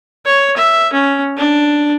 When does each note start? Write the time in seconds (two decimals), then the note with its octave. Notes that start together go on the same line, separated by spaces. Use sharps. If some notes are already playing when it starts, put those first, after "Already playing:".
0.25 C#5
0.57 E5
0.93 C#4
1.37 D4